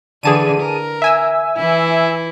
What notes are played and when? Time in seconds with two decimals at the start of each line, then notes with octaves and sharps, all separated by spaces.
0.23 D3 E3 G#4 A5 D#7
0.61 A#4
1.02 E5 G#5 E6
1.58 E3 E4